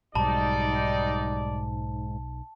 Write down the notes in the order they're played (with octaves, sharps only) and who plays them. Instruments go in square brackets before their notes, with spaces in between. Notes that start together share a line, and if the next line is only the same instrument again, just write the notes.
[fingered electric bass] B1 [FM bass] G#2 [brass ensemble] G3 D#4 D5 [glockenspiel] A5 B5